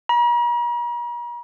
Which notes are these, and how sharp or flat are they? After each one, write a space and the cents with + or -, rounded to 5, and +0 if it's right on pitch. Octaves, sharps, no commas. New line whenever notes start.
A#5 +45